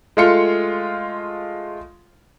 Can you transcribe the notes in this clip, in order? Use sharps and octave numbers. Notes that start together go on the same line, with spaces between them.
G#3 A3 F4 F5 C#7